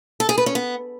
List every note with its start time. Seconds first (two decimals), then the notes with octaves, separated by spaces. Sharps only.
0.20 A4
0.29 G#4
0.38 B4
0.46 C#4
0.55 B3